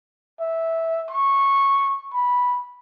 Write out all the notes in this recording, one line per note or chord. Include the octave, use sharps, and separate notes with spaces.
E5
C#6
B5